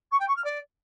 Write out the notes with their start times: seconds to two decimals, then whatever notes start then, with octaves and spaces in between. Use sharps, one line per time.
0.11 C#6
0.20 G5
0.28 C#6
0.36 F6
0.44 D5